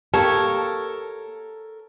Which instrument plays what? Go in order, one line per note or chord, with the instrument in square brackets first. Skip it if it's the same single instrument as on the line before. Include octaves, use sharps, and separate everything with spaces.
[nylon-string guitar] A#3 G4 [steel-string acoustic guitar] A4 A#4 [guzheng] C#5 [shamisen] A5